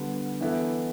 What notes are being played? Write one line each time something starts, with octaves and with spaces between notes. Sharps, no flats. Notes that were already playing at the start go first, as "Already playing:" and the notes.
Already playing: D3 G3 B3
E3 B3 E4 A4